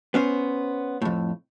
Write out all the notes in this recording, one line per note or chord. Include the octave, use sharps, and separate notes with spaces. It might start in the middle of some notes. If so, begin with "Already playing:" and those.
B3 C#4 C5
F2 A2